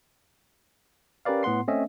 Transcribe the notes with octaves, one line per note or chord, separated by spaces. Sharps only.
C#4 G4 A#4 B4 D5 F5
A2 B3 F#5 C6 C7
A3 C4 C#4 D#5 E5